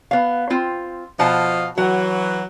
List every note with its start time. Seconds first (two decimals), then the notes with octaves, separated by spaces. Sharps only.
0.11 B3 F5
0.50 C4 F4
1.19 B2 F3 D#5 F5 F#5 A5
1.78 E3 F#3 F#5